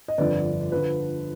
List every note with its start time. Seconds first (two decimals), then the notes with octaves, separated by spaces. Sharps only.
0.08 D#5
0.18 G1 F2 D3 B4 D5
0.72 D3 F3 B4